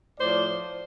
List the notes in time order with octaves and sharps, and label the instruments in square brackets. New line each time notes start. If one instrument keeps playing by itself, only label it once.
[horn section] A2 F3 C5 D5